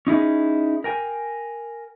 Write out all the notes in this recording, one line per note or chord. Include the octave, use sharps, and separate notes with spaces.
C#4 D#4 E4 G#4
A#4 G5 G#5